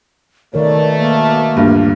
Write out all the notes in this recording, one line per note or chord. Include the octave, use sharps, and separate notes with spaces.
B2 D#3 A3 A#4 C#5 D5
A#3
D2 G2 A#2